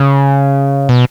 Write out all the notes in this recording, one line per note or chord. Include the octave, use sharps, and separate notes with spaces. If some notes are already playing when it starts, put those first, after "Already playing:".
Already playing: C#3
B2